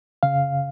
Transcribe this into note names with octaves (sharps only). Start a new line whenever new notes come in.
C#3 F5